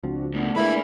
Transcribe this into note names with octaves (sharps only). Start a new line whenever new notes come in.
C#2 F3 C4 D4 F#4
D2 B2 A3 D4 D5
G#3 A#3 E4 G#4 B4 B5